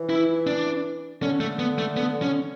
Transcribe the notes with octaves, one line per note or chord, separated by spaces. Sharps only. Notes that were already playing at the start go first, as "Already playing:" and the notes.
Already playing: E3
E4
D4
D3 C#4
A3
B3
A3
B3
C#4